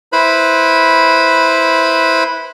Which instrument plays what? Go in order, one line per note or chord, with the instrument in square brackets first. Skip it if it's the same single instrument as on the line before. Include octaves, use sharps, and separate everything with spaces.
[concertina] E4 B4 C5 B5